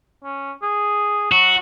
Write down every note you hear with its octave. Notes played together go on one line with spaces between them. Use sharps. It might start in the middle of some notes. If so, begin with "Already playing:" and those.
C#4
G#4
F#3 F#4